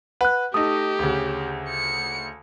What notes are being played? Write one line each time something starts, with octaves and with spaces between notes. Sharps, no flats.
B4 F#5 F#6
A3 D#4 G4 D#6
D2 C#3
C#7